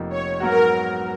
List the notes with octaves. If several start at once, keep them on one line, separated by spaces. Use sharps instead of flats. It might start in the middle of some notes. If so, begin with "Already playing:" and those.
Already playing: F1 F2 F3 A#3 D#4
C#5
G#2 F#3 B3 F#4 A#4